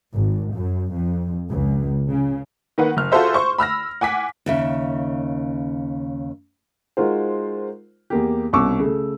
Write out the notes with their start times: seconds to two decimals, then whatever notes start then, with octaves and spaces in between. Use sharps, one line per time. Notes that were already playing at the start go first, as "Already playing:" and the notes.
0.14 G#1
0.53 F#2
0.93 F2
1.50 C#2
2.10 C#3
2.78 D#3 A#3 B4 F#5
2.97 F#1 F6
3.12 F4 F#4 G#4 A4 C5 E5
3.34 C5 C#6
3.58 B5 E6 F6 A#6
4.01 F#5 G#5 D6 B6
4.46 D#2 C#3 E5
6.97 G#3 D#4 F4 F#4 A#4 C5
8.10 E2 A#3 G4
8.53 C2 B2 C#4 C#6 D6 E6
8.79 C#3 A3